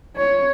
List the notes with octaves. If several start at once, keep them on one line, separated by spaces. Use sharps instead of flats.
C#5